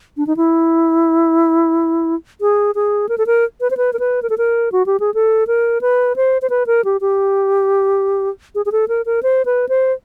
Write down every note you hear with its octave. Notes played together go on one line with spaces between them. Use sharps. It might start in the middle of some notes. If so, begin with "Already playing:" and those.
D4
D#4
E4
G#4
G#4
A#4
A4
A#4
B4
C5
B4
A#4
B4
A#4
A4
A#4
F#4
G4
G#4
A4
A#4
B4
C5
C5
B4
A#4
G4
G4
G#4
G#4
A4
A#4
A#4
C5
B4
C5